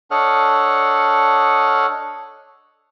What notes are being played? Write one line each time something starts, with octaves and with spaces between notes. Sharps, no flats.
D4 A4 C#5 D#5 F#5 F6